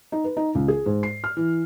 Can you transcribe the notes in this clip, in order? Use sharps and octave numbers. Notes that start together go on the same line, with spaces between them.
D#4
B4
D#4
C#2
G#4
G#2
C7
F6
E3